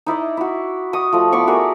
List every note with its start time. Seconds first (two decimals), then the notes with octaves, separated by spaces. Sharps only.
0.06 D#4 E4 D5 D#5
0.37 E4 F#4
0.93 F#4 D#5 D#6
1.12 F3 A3 D#5
1.32 B3 E4 D5 C#6
1.47 F#4 G#4 A#4 D5